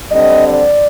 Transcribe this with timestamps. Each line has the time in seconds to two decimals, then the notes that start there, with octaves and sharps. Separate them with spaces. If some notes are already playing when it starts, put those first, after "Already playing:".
0.11 D3 G3 C4 D#5
0.48 D5